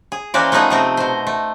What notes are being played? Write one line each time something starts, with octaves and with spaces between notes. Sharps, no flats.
G#4
E3 A#3 C#4 F#4 C5 D5
F3 A3 B3 D#4 G#4
C3 A3 C4 D#5
B2 C5
A3